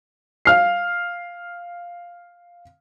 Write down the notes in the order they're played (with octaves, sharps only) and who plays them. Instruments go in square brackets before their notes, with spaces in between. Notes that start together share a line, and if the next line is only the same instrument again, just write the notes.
[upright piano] F5 F6 C7